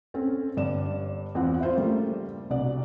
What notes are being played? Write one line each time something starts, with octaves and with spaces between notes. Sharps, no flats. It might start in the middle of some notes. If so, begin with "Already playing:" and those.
C4 C#4 A4
G1 G2 D5 E7
E2 C4 F4 F#5
F4 C5 E5
C#3 G3 A3 A#3
C2 B2 D4 D5